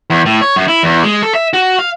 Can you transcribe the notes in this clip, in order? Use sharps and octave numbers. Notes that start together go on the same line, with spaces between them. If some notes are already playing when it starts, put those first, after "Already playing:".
E2
A2
C#5
F#2
E4
E2
G#3
A4
E5
F#4
F5